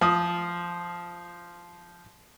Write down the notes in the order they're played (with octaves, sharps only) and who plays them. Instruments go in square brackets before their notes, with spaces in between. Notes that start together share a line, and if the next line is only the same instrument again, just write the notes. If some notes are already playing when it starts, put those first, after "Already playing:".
[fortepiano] F3 D#6